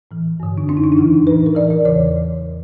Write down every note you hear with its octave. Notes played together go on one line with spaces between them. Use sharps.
A2 E3
G2 D3
D4
F#2 D3 C#4
D#4
D4
D#4
F2 C#3 E3 E4
A2 E3 B4
A#4
A2 E3 D5
D5
E2 C#3 E3 C#5